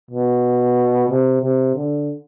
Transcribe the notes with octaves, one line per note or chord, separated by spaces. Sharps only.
B2
C3
C3
D3